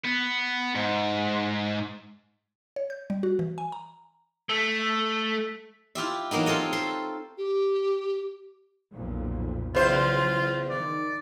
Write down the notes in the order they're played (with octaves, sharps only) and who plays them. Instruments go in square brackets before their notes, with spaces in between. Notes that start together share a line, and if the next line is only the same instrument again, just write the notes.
[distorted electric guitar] B3
G#2
[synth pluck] C#5
G6
G3
F#4
E3
G#5
A#5
[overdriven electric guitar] A3
[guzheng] E4 F4 G4 E5
E3 F#3 A#3 B3 D#4
C4 F4 A4 C#5 D#5
A4 C5 C6
[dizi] G4
[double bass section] B1 F2 A#2
[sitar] E2 C5 [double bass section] C#3 F#3 [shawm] F4
[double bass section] D#3 [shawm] D5